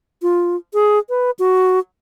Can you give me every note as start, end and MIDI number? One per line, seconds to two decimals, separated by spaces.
0.22 0.56 65
0.74 0.99 68
1.09 1.31 71
1.39 1.79 66